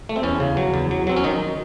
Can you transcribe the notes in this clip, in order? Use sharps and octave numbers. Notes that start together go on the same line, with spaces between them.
A3
C4
E2 C#4
C#3
F#3
E2
F#3
F#3 C4
C#4
D#3 D#4